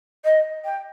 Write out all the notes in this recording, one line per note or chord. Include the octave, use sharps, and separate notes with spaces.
D#5
G5